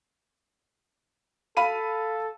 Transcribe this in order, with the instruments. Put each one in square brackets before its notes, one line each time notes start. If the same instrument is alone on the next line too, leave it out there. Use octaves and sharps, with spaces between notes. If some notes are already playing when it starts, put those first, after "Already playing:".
[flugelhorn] A4 [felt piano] F5 B5 D#7